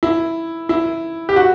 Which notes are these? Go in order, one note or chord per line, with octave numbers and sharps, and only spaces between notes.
E4
E4
G4
F#4